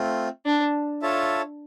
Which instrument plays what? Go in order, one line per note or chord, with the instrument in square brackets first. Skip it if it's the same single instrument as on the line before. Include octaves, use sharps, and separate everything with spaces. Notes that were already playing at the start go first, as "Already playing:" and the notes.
Already playing: [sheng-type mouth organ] A3 C4 F4
[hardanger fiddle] D4
[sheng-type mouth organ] F4 A4 C#5 E5 A5